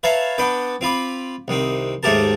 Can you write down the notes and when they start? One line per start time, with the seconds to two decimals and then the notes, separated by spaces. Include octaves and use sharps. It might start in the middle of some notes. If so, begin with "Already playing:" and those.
0.03 B4 C#5 E5 F5 A5 A#5
0.38 B3 D4 B4 G5
0.81 C4 F4 B5 D6
1.48 C2 D#3 C4
2.03 D#2 G#2 A3 G4 A#4 A5